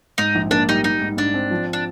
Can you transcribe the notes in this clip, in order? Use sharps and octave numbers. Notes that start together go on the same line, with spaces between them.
G#2 D#4
A#1
A#3 D4
G3 D#4
G3 D#4
G#2
G#2 D4
C4
F3
D4